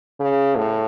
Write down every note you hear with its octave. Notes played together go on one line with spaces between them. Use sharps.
C#3
A2